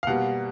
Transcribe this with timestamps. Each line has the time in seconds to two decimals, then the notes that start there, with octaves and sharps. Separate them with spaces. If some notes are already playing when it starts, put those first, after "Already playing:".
0.03 F5
0.07 B2 G3 A#3 F#5